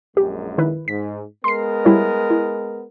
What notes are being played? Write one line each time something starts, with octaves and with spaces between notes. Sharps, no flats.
A#1 F#2 G#3 G4
D#3 E4 B4
G#2 B6
G#3 B3 A#4 C6 C7
G3 E4 C#5
E4